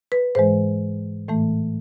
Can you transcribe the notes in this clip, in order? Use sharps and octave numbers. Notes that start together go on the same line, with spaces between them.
B4
G#2 E3 G#3 C5
A2 E3 A3